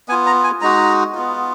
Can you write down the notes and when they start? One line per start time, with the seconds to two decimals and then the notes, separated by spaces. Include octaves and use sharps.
0.08 B3 G#5
0.12 F4
0.26 A#5
0.44 G#5
0.61 G#3 D#4 F#4 A#5
1.14 B3 F4